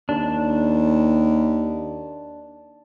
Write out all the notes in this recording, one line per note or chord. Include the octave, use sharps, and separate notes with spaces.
D#2 D4